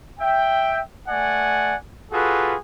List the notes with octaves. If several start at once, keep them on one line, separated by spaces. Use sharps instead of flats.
E5 G5
A3 D5 F#5 G#5
F4 F#4 G#4 A4 B4